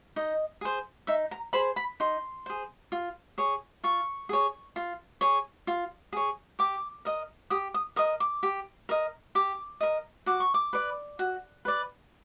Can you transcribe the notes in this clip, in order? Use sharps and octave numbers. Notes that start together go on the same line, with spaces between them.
D#4 D#5
G#4 C5
D#4 E5
A#5
G#4 C5 B5
B5
D#4 C6
G#4 C5
F4
G#4 C#5
F4 C#6
G#4 C#5
F4
G#4 C#5
F4
G#4 C#5
G4 D6
A#4 D#5
G4 D#6
D#6
A#4 D#5 D#6
D6
G4
A#4 D#5
G4 D6
A#4 D#5
F#4 D6
C#6
D6
B4 D5
F#4
B4 D5